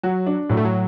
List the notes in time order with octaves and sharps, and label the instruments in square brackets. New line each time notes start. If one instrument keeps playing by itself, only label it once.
[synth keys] F#3 [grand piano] F#4
[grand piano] D4
[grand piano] A2 [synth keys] F#3
[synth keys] A3
F#3